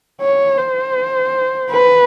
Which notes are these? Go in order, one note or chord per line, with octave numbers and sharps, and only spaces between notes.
C#5
C5
B4